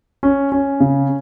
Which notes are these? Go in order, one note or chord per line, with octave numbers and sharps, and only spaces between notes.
C#4
C#4
C#3